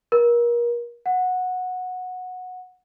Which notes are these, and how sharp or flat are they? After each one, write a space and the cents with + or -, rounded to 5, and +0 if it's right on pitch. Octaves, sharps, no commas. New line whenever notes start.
A#4 +30
F#5 -15